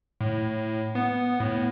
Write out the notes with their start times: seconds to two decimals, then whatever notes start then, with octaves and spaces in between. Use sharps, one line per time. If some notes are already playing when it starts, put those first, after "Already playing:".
0.21 A2
0.95 B3
1.40 A2